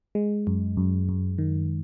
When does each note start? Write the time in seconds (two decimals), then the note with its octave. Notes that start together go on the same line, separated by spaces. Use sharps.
0.15 G#3
0.47 F#2
0.77 F#2
1.09 F#2
1.38 D#3